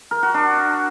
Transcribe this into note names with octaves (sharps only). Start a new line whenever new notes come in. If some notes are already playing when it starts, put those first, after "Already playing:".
A#4
F#4
D4